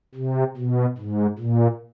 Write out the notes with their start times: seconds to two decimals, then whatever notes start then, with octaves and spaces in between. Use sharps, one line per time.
0.15 C3
0.57 B2
0.98 G#2
1.39 A#2